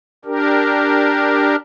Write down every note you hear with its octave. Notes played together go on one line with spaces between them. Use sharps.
D4 G4 A#4